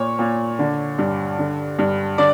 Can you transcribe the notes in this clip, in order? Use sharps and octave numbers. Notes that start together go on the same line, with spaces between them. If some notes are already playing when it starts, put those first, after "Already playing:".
Already playing: A#2 C#5
A#2
D3
G2
D3
G2
D3 D5